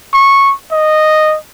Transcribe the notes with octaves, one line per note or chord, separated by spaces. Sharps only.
C#6
D#5